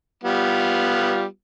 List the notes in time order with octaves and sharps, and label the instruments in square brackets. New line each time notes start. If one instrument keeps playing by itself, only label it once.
[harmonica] G3 B3 F4